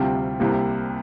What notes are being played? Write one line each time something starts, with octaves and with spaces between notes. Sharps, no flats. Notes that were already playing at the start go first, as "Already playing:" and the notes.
Already playing: D2 C3 G3 C4 F4
C2 C3 G3 A#3